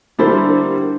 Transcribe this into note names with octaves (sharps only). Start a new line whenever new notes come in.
D3 G3 A#3 D4 E4 C5